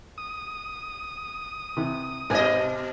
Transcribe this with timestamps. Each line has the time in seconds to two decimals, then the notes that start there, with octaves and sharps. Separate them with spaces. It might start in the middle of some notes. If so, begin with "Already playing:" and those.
0.18 D#6
1.77 C3 E3
2.30 G#1 B2 B4 D#5 G#5